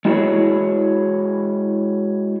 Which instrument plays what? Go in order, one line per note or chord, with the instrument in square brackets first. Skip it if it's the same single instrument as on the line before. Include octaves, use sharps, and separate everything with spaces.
[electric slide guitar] G#3 E4 F#4 G#4 C#5